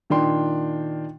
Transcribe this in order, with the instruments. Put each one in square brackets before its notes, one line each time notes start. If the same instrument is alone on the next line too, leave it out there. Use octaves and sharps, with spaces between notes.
[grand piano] A#2 D#3 D4 G5 C6